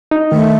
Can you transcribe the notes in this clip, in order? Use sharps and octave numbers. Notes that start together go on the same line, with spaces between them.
D#4
D#3 A3